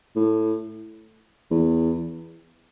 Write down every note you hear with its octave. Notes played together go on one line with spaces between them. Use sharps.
A2
E2